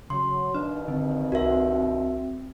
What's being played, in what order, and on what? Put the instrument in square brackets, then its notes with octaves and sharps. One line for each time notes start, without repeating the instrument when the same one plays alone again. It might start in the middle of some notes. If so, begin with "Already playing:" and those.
[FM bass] C#3 [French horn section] F#3 [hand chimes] C6
[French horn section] G2 B2 D#3 [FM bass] D4 [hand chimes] F6
[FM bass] D3 [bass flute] C4
[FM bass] C2 [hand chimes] F#4 A#4 E5